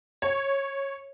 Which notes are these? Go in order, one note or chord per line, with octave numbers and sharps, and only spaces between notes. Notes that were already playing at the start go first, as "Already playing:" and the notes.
C#5